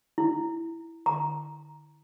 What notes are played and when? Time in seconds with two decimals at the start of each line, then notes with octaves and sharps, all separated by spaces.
0.18 E4
1.06 A#5